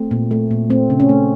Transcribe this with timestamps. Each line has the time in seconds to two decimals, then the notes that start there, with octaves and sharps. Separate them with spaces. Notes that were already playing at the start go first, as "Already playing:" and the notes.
Already playing: A3 C4
0.11 A#2
0.31 A3
0.51 A#2
0.70 A3 C4
0.90 C#3
1.00 C#4
1.09 A3